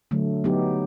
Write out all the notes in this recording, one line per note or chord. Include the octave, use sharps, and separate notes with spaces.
D3 F#3 A3
F#3 B3 D#4 G4